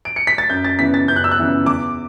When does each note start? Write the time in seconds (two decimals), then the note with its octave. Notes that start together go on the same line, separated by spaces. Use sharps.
0.05 D7
0.16 C#7
0.27 B6
0.38 A6
0.50 F#2 G6
0.64 A6
0.79 C#3 E3 B3 B6
0.94 A6
1.08 F#2 G6
1.16 F#6
1.24 E6
1.31 F#6
1.38 C#3 E3 B3
1.66 E2 D6